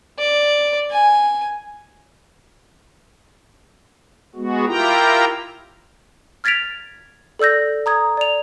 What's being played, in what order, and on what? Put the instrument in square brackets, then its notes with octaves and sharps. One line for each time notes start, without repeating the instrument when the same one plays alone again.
[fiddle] D5
G#5
[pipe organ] G#3 B3 F#4
E4 F4 G4 A#4 G5 A#5
[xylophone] F6 G#6 A6 B6 D7 F7
A4 D5 E6 G6 A#6
A#5 D#6 G#6
D5 F7